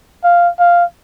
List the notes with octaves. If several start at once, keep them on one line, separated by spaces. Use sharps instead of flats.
F5
F5